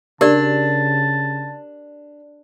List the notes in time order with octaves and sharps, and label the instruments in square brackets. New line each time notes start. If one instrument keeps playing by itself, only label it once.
[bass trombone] C#3 [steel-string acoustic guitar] D4 [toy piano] G4 A#4 D5 [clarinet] A5